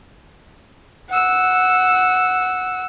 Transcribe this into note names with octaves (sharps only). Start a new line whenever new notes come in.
F#5 E6